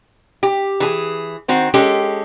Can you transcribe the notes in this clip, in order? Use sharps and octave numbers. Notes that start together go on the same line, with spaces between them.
G4
E3 G#4
D#3 C4 F#4
G#3 C#4 G4 A4